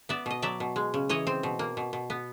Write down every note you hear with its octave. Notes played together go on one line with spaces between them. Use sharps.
B3 D5 E5
B2 D#5
F#3 D5 E5
B2
G#3
C#3
E3 C#5 D#5
C4
B2
A#3
B2
B2
B3